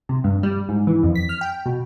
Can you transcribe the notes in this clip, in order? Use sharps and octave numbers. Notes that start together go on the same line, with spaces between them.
C3
G2
G3
G#2
E3
F2
B6
F6
G5
B2